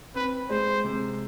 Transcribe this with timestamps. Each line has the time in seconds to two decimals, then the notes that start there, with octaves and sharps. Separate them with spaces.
0.15 C4 B4
0.49 G#3 C5
0.84 C3